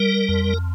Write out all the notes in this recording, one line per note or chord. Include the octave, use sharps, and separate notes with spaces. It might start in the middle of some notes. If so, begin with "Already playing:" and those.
Already playing: G3 A#4
F2